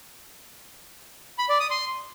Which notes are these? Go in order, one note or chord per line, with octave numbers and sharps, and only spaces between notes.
B5
D5
D#6
C6